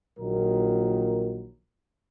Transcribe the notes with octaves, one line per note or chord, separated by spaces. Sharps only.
A#1 A#2 D#3 F#3 A#4